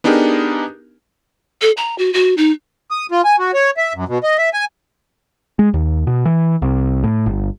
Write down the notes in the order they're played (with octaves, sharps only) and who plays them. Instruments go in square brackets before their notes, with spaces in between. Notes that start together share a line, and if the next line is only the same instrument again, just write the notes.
[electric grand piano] B3 D4 D#4 G4 G#4 A#4
[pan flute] A4
A#5
F#4
F#4
D#4
[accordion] D#6
F4
G#5
F#4
C#5
E5
F#2
B2
D#5
E5
G#5
[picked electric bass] G#3
D#2
B2
E3
C2
A2
G1